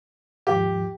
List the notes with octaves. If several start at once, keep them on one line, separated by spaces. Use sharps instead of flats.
D#2 G#2 F3 G4